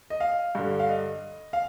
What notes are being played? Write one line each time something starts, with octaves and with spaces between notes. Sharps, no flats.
D#5
F5
G2 D3
F5
D#5
F5